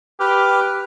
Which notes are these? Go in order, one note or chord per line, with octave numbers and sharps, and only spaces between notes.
G4 B4 D6 F6